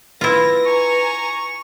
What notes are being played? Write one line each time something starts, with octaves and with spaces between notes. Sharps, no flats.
E4 F4 B4 A#6
G#5 A#5 C#6